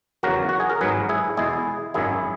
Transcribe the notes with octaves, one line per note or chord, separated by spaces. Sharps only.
E2 C#3 F#3 F#4 A#4
F#4
G#4
A#4
G#1 G#2 F#3 G#4 B4
E4 G#4
E2 B2 G#3 E4 G#4
G#1 F#2 D#3 F#3 E4 G#4